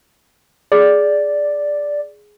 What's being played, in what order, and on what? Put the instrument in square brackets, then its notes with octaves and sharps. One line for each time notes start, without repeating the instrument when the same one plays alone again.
[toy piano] G#4 [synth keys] D5